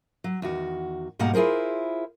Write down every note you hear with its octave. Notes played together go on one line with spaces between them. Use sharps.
F#3
E2 D#3 F#4
G#2 B2 G3 A#3 F#5 A#5
E4 F4 G#4 A#4 C5